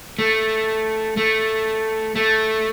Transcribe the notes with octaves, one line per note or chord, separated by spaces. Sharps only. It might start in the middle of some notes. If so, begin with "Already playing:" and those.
A3
A3
A3